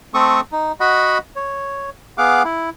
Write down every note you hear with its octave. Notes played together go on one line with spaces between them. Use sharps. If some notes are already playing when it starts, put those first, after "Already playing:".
A3 C4 A4 C#6 D#6
D#4
F#4 D#5 F#5 B5
C#5
B3 G#4 F5 F#5 D6
E4